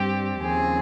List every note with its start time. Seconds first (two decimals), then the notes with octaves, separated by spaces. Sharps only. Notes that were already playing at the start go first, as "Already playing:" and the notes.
Already playing: G2 G3 C4 G4
0.42 D#2 C#3 F3 C4 G#4